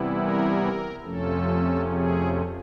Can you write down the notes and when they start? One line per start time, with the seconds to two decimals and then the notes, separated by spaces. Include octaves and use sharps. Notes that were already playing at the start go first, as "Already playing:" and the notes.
Already playing: C3 E3 G3 B3 E4
0.17 A#4
1.03 F2 C3 F3 A3 C#4 A4
1.90 G#4